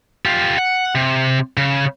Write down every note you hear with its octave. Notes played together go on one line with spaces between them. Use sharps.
F4 G4
F#5
C3
C#3